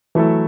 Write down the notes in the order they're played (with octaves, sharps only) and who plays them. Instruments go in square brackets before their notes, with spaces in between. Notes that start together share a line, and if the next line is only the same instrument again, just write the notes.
[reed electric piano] E3 [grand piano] F#3 A3 E4 A4